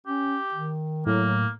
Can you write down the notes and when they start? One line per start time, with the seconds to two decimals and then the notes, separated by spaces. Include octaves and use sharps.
0.07 C#4 G4
0.54 D#3
1.06 A2 F#3 A#3